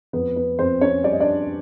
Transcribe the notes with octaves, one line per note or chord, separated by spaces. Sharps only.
F2 B3 B4
B3 B4
F2 C4 C5
C#4 C#5
G3 D5
D#5
D4 D5